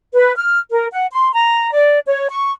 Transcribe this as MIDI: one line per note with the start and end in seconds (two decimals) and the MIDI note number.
0.13 0.35 71
0.36 0.60 89
0.70 0.87 70
0.91 1.06 78
1.12 1.30 84
1.32 1.70 82
1.72 1.99 74
2.07 2.27 73
2.30 2.52 85